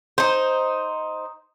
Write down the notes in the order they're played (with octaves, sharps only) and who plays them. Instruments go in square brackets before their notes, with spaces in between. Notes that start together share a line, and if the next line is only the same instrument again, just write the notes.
[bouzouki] D#4 C5